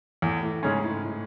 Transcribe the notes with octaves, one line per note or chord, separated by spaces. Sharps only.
E2 A2
A2
G#2 C#3 G#3 C#4
A2
A2